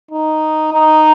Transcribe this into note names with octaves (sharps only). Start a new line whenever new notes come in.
D#4
D#4